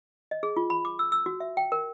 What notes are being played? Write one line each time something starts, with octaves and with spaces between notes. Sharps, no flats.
D#5
G#4
F4
B5
D6
E6
E6
F#4
E5
G5
A#4